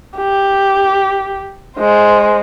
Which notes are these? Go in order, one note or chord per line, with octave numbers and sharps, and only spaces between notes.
G4
G#3 C5